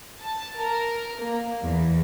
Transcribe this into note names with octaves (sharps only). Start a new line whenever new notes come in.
A5
A#4
A#3
E2